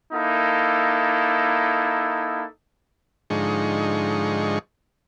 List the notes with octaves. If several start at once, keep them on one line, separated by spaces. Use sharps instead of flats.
A#3 D#4 E4 A4
G#2 D3 F3 G#3 D#4 C#6